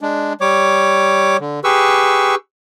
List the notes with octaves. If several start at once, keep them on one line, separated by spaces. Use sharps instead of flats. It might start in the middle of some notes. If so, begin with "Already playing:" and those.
G#3 D4
G3 C#5 D6
D3
G4 G#4 B4 C#6 E6